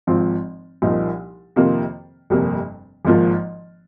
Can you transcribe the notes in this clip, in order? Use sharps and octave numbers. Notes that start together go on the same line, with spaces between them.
G#1 G#2 F3 C4 F4
C2 A#2 F3 A#3 D#4
F2 C3 D#3 A#3 F4
G1 F2 C3 G3 A#3
G#1 G#2 F3 A#3 F4